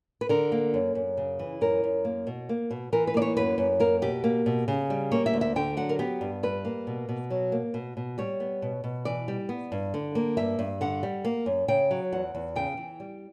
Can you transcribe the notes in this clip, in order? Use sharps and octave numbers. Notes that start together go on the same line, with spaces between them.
B4
D3 A#4
A#3
F#2
F#2
C#3
E3
F#2 A#4
F#2
A#3
B2
A#3
B2
E3 A#4
B4
A#3 D5
C#5
F#2 B4
F#2
A#3 A#4
B2 G4
A#3
B2
C#3
G3
A#3 C#5
E5
D2
E5
D3 G5
F#3 F#5
A#4
B3 G4
G2
G3 B4
A#3
B2
B2
F#3
A#3
B2
B2
G3 C#5
B3
B2
B2
E3 D5
G3
B3
G2
D3
A#3
G2 E5
G2
D3 F#5
G3
A#3
F#2
C#3 G5
F#3
E2 F#5
E2
C#3 G5
E3
G3